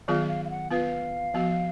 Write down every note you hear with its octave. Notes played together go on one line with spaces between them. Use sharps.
D#3 F#3 B3 F4 G#4 F5
F5
F5
F#5
B3 F4 B4 F5
F3 B3 F#4